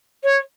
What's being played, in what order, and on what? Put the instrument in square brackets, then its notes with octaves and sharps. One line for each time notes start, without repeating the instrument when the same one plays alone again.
[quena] C#5